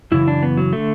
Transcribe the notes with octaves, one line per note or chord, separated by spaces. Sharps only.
F#2 C#3 E3 E4
D4
B3
F#3
D3 A3